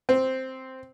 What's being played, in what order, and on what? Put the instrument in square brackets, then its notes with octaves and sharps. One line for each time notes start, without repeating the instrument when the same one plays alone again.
[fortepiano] C4